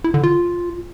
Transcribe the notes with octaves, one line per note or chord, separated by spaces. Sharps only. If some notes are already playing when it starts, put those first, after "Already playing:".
E4
D3
F4